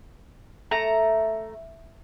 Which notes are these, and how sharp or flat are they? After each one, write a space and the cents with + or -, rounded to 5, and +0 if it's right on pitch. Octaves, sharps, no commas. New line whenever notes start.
A3 +0 A#5 +0